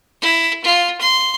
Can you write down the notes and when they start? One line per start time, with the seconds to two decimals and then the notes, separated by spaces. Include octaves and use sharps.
0.22 E4
0.64 F4
1.01 C6